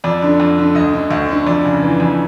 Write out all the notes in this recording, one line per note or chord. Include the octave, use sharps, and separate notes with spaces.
F2 D5
D3
F2
D3
D2 D#5
D3
D2
D3
F2 D5
C#3
E3
F2